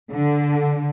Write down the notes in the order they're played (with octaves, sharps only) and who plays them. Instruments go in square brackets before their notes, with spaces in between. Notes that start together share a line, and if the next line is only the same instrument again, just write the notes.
[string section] D3